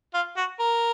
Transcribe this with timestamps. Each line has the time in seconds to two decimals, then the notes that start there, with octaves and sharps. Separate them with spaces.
0.14 F4
0.37 F#4
0.60 A#4